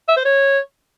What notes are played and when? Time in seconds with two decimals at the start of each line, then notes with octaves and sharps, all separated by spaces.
0.09 E5
0.17 C5
0.25 C#5